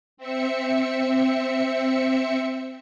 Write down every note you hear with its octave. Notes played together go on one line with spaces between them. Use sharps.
C4 E5 C#7